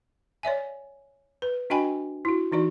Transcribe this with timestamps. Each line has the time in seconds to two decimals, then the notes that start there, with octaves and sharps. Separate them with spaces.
0.43 C#5 D5 E5 G#5
1.42 B4
1.70 D4 F#4 D#5 G5 G#5 B5
2.25 E4 F#4
2.52 E3 D#4 F#4 D5